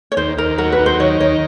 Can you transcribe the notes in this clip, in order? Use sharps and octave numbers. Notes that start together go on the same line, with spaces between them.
C#5
D#2 C5
D#2 A#4
F#3 A#4
B4
D#2
C5
D#3 C#5
D#2 C#5